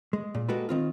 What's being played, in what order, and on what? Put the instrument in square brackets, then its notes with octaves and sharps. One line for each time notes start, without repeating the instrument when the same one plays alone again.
[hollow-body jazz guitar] G#3
A#2
G#3 A#3 F#4 G4 A4 B4
D#3 C4 F4